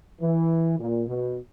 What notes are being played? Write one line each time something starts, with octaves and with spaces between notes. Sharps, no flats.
E3
A#2
B2